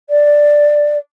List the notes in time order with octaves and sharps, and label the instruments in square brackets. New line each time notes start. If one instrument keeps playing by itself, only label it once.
[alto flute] D5